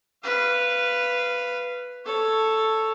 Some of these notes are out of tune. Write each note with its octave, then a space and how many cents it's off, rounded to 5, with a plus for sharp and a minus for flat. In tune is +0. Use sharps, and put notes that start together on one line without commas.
B4 +0 F5 -15
A4 +0 C#5 +0